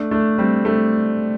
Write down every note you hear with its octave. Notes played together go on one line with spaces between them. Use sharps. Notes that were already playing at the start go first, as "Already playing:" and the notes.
Already playing: A3 D4
A3 D4
G3 C4
A3 D4